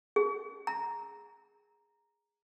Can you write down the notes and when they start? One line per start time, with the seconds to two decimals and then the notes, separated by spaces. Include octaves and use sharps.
0.16 G#4
0.67 A#5